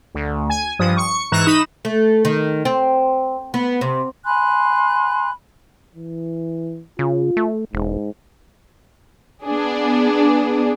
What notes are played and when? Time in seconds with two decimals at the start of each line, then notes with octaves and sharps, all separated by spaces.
0.15 D2
0.50 G#5
0.79 G2 F3 D#6
0.97 C#6 C#7
1.32 G#2 E3 A#5 C#6 F#6 E7
1.46 D#4 B5 D#6 E7
1.85 A3
2.25 D#3
2.65 C4
3.54 B3
3.81 C3
4.25 G#5 B5 C6 F#6
5.96 E3
6.99 C#3 F4
7.37 A3
7.73 E1 G#2
9.44 B3 D4 G#4